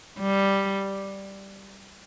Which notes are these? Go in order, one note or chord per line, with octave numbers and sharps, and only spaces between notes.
G3